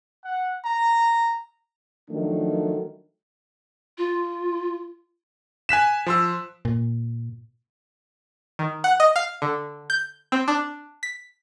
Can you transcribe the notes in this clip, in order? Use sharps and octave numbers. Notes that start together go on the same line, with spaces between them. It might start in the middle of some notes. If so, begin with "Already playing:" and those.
F#5
A#5
D#3 F3 F#3 A3 D4
F4
G#5 F#6 B6 E7
F3 C6 E6
A#2
D#3
F#5
D#5
F5
D3
G6
C4
D4
B6